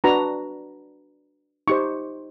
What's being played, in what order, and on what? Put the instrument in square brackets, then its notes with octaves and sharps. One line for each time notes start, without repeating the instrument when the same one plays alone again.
[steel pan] D4 F#4 B4 A#5
D#4 G4 C5 C#6